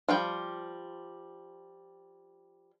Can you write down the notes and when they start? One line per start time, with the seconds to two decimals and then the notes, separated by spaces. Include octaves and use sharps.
0.08 F3 G3 G5